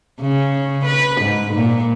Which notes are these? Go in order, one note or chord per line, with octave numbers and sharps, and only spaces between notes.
C#3
B4
G#2
A#2